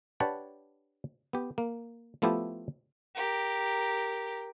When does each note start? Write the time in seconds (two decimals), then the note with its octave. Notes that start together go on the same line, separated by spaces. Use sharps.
0.20 D4 G4 B4 C#5 F#5 A5
1.33 B3 G4
1.58 A#3
2.22 F3 A3 B3 E4 F4 G4
3.15 G4 A#4